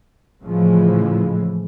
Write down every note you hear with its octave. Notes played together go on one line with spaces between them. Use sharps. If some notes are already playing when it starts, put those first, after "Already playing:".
A2 C#3 E3 F3 G#3